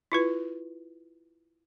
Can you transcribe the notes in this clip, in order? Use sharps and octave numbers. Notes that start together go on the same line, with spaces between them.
E4 F4 B4